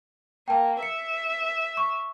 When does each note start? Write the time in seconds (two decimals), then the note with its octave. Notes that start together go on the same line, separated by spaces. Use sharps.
0.48 A#3 G5 A5
0.83 E5 C#7
1.77 C#6